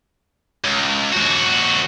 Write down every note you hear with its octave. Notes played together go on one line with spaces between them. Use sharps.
C#2
D#2 F#4